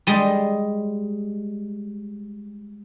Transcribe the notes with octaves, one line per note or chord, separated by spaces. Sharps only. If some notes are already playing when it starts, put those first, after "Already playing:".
G3 G#3